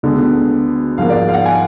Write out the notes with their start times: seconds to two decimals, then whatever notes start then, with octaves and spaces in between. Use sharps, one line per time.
0.03 D2 D3 G#3 B3
0.98 G#2 F3 A#3 F5
1.10 D5
1.29 F5
1.34 F#5
1.46 G#5